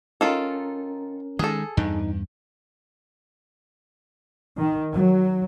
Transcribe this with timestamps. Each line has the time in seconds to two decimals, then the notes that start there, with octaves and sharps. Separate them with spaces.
0.21 D#3 C#4 F4 A4 A#4
1.39 D#3 G#3 G#4 A4
1.77 E2 G2 D#4
4.57 D#3
4.94 F#3